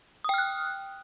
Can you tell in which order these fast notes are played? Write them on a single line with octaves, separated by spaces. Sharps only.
D#6 G5 F6 F#6